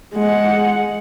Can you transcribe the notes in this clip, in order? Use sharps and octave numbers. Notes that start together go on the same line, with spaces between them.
G#3 F#5